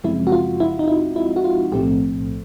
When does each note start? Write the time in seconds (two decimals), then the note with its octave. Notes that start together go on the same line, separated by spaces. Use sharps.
0.04 F#2 C#3 F3 G#3 C4 E4
0.27 F#4
0.32 F4
0.60 E4
0.79 D#4
0.88 E4
1.16 E4
1.36 F#4
1.44 F4
1.72 B1 A2 F3 A3 C4 G4